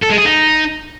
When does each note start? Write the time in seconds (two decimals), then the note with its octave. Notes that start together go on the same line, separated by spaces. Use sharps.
0.03 A4
0.11 G#3
0.18 G#4
0.26 D#4